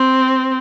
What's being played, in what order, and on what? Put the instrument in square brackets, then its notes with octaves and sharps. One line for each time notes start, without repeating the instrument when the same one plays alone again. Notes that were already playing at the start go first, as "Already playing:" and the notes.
Already playing: [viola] C4